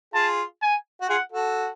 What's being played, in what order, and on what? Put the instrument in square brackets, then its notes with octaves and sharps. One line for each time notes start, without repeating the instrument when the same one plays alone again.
[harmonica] F4 G#4 [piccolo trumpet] A5
[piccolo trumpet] G#5
[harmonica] F#4
[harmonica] F4 G#4 [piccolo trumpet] F#5
[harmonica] F#4 A4